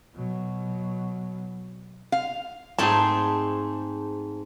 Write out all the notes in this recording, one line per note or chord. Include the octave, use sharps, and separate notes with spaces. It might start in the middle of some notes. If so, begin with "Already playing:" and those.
B2 F#3
F5
G#2 A3 C4 G#4 A5